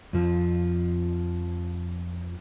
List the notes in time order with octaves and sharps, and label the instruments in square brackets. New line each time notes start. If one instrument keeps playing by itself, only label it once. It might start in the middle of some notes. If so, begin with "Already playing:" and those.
[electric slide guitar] F2 F3